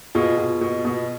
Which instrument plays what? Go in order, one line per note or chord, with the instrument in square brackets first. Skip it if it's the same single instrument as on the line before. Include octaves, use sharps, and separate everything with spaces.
[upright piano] B2 F4 G#4
B2
B2
B2